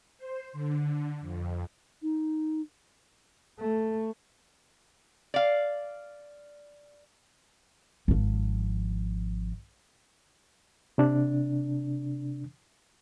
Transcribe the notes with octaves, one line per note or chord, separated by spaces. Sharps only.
C5
D3
F2
D#4
A3
D5 F5
G#1 F3
C3 D4